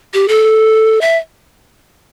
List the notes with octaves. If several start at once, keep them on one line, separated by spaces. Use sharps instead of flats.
G4
A4
E5